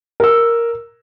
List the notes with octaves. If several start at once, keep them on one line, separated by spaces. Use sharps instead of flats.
A#4 E6